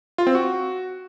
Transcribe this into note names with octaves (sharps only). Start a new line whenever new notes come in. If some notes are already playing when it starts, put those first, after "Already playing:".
F4
C4
F#4